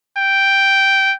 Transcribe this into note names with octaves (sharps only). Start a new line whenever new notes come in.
G5